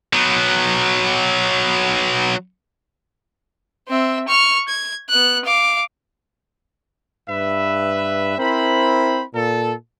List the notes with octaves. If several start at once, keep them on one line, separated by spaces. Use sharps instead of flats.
F#3 B3
C4 E5
C#6 F6
G#6
B3 F#6
F5 D6
G2 B4 E5
C4 E4 A#4 C5 B5
A#2 A4